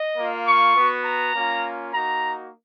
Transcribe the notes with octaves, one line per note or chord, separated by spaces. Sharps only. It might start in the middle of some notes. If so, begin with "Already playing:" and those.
Already playing: D#5
A#3 F4
C#6
B3 F#4
A#5
A#3 C#4 F4
A#3 D#4 F#4 A#5